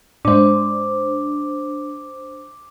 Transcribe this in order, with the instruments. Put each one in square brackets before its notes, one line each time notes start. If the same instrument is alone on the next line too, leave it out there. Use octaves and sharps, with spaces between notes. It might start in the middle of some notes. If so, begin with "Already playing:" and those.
[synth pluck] G#2 G#3 [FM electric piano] D4 C5 [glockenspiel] D6